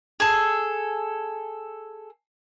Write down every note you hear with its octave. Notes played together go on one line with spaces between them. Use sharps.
G#4 A4